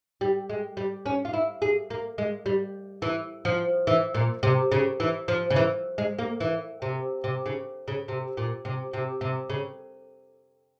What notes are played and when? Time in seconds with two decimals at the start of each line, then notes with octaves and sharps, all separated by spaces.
0.21 G3
0.50 G#3
0.77 G3
1.06 C#4
1.25 F4
1.33 E4
1.62 G#4
1.90 A#3
2.18 G#3
2.46 G3
3.02 E3
3.45 F3
3.87 E3
4.14 A#2
4.43 C3
4.72 C#3
5.00 E3
5.28 F3
5.50 C#3
5.56 E3
5.98 G#3
6.19 A#3
6.40 E3
6.82 C3
7.24 C3
7.46 C#3
7.88 C#3
8.08 C3
8.37 A#2
8.65 C3
8.93 C3
9.21 C3
9.49 C#3